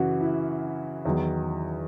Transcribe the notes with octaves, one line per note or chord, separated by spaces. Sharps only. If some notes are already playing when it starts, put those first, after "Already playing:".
Already playing: F#2 C#3 E3 F#4
E4
E2 D#3 F#3